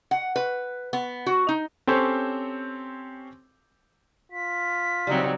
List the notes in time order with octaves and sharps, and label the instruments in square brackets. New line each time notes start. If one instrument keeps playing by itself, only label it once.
[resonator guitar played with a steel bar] F#5
B4
B3
F#4
D#4
[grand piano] C4 C#4 G4 A4 C5 C#5
[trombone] F4 [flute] B6
[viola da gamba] C#3 F#3 C4 [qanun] G3 D#4 G5